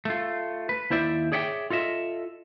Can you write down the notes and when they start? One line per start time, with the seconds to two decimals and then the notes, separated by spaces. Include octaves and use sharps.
0.05 A3 F4
0.69 B4
0.90 D#2 E4 C5 D5 E5
1.32 G#4 C#5 D5 E5 F#5 G5
1.70 F4 A4 D#5 E5